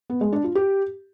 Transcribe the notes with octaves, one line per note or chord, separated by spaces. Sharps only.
B3
G#3
D4
F4
G4